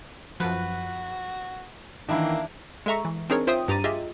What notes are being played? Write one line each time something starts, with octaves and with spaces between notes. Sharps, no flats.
F#2 F3 F#4 B4
D#3 E3 A#3 D4 E4
G#3 A4 E5 A#5 C#6
E3
C4 D4 D#4 G#4 A#4 C#5
F4 C5 E5 G5 C6 D#6
G2 G4 A#5 A6 D#7
F4 G4 G#4 D#5 E5